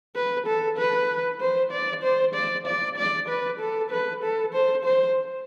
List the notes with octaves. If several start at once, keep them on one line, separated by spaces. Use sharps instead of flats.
B4
A4
B4
C5
D5
C5
D5
D5
D5
B4
A4
B4
A4
C5
C5